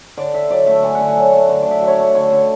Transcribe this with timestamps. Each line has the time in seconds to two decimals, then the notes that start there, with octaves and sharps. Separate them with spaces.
0.17 D3 D5
0.34 D3 E5
0.51 F#3 D5
0.67 A3 E5
0.83 D3 G#5
0.95 F#5
1.00 D3
1.07 G#5
1.17 F#3
1.33 A3
1.49 D3
1.62 D3 D5
1.71 E5
1.82 F#3
1.87 C#5
1.93 D5
1.99 A3
2.14 D3 C#5
2.32 D3